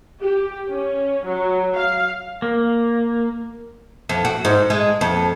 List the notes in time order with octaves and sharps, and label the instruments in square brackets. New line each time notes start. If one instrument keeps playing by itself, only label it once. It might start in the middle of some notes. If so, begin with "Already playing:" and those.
[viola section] G4
C#4
F#3
F5
[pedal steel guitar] A#3
[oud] F2
F#4
G#2
G#3
F2